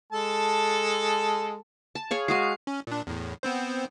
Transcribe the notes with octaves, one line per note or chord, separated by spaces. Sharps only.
G#3 A4 A5
A5
G#4 C#5 F5
G#3 F#4 F5 C#6 D#6 C7
C#4
A#2 D4
E2 A2
B3 C4 C5